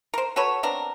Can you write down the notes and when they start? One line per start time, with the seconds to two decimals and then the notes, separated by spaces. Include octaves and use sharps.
0.14 A#4 C5
0.36 F#4 A4 B4 C#5
0.63 B3 C4 D4 A#4